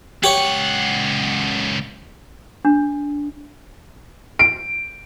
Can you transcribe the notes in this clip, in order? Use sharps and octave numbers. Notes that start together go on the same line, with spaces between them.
C#2 G4 C#5 F#5
D4
D7